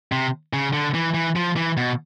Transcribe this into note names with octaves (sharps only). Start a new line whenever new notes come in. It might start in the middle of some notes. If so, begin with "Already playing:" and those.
C3
C#3
D3
E3
E3
F3
E3
B2